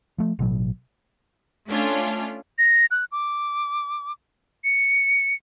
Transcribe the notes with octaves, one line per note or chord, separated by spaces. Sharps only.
F3 A3
A1 B2 F#3
A3 C#4 D4 F4
A#6
F#6
D6
C#7